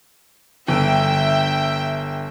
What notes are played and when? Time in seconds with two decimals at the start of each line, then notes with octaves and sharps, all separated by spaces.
0.68 G1 E5 G5